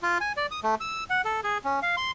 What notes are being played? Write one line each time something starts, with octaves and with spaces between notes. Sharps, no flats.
F4
G#5
D5
D#6
A3
E6
F#5
A4
G#4
C#4
F5
C6